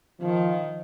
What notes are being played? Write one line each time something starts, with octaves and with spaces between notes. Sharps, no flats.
D#3 F3